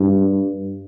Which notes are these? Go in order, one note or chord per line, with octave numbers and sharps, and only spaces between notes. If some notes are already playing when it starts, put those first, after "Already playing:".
Already playing: G2